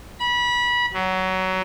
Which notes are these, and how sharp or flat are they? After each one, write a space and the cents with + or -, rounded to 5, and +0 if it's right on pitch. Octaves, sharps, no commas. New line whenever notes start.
B5 -25
F#3 +20